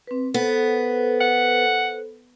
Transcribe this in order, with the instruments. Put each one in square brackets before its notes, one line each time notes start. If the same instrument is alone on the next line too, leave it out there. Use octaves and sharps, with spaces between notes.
[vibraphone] C4 B4
[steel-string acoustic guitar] B3 [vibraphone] A4 B4 C5
[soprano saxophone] F#5